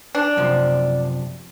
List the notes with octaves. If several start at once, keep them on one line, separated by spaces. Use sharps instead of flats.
D4
F#2 C3 F3